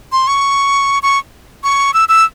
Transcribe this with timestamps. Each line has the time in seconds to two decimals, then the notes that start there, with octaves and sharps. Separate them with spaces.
0.12 C6
0.27 C#6
1.03 C#6
1.64 C#6
1.94 E6
2.09 E6